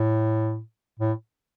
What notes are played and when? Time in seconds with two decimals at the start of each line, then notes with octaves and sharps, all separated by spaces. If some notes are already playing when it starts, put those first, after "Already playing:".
Already playing: A2
0.99 A2